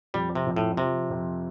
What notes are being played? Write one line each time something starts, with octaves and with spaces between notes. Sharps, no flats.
F2 G3
C3
F2
A2
C3 F3
F2